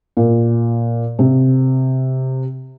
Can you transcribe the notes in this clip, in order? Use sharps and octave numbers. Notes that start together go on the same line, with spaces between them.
A#2
C3